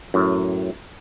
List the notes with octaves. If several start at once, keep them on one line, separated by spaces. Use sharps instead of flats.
F#2 A2